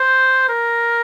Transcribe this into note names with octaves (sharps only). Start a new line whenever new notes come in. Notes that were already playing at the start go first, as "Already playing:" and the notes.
Already playing: C5
A#4